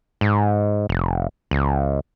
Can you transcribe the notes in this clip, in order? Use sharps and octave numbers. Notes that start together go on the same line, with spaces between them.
G#2
F1
C#2